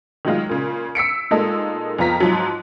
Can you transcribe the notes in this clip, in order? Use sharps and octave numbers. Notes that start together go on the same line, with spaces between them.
D#3 F#3 G#3 F4
A#2 C#3
E6 B6 C#7 D7
A#2 G#3 A#3 D#4 A4
F2 B3 F4 A#5 B6
G#2 F3 F#3